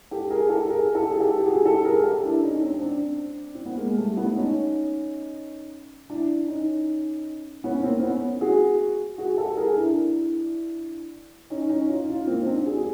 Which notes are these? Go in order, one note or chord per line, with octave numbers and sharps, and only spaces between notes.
G4 A4
G#4 A#4
G4 A4
G#4 A#4
G4 A4
G#4
G4 A4
G4
F#4 G#4
G4 A4
G#4 A#4
G4 A4
D4 E4
C#4 D#4
C4 D4
C4 D4
C4
B3
G#3 A#3
G3 A3
A3 B3
C#4 D#4
D4 E4
C#4 D#4
B3 C#4
A#3 C4
B3 C#4
F#4 G#4
F#4 G#4
G4 A4
G#4 A#4
D4 E4
C#4 D#4
C#4 D#4
D#4 F4
D#4 F4
A#3 C4
D#4
C4 D4
F#4 G#4
G#4